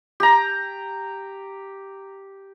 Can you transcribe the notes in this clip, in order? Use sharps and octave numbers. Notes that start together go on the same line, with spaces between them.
G4 A#5